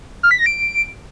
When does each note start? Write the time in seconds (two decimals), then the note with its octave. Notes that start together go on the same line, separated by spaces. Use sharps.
0.23 F6
0.31 B6
0.39 A#6
0.46 D7